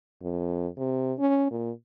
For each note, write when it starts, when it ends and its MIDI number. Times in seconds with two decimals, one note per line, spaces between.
0.22 0.68 41
0.78 1.13 48
1.19 1.48 61
1.51 1.71 46